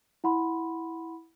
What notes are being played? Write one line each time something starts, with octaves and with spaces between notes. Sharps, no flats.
E4 F#5 B5 C6